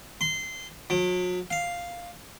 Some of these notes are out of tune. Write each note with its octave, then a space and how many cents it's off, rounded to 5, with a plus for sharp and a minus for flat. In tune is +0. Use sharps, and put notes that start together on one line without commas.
C6 -20
F#3 -40
F5 +0